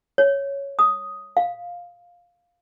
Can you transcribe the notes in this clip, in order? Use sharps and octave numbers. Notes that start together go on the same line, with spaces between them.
C#5
D#6
F5